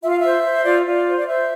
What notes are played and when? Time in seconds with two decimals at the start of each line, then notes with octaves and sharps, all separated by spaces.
0.03 F4 E5
0.10 F5
0.17 E5
0.24 C5
0.43 C5
0.64 F4 D5
0.85 F4
0.90 D5
1.06 C5
1.16 D5
1.26 C5 E5